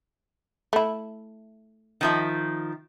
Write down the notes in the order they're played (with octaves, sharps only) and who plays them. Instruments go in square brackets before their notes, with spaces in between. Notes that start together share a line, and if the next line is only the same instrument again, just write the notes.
[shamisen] A3 E4
[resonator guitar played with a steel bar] D#3 F3 E5